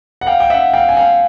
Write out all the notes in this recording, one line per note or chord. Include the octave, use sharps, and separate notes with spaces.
F#5
F5 G5
G5
E5 F#5
F5 G5
G#5
F5 G5